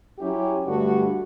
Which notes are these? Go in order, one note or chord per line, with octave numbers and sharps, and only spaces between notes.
F#3 C#4 E4 G4
G2 D3 A3 D4 F#4